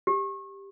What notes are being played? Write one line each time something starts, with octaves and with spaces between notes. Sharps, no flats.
G4